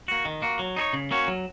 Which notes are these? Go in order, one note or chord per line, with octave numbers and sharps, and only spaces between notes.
A#3 F#4
D#3
A#3 F#4
F#3
D#4 G#4 C#5
C#3
A#3 C#4 F#4 C#5
F#3